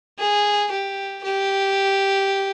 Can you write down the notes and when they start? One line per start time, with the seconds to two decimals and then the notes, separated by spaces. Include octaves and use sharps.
0.19 G#4
0.71 G4
1.24 G4